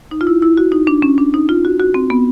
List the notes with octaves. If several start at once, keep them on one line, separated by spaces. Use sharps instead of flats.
D#4
F4
E4
E4
F#4
D#4
D4
C#4
D4
D#4
F4
F#4
F#4
C4
B3